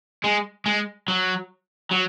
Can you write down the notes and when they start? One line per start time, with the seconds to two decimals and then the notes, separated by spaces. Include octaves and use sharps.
0.24 G#3
0.66 G#3
1.08 F#3
1.92 F#3